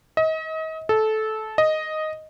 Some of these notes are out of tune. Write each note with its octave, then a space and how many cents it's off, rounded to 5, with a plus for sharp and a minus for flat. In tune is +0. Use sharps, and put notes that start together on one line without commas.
D#5 +35
A4 -15
D#5 +0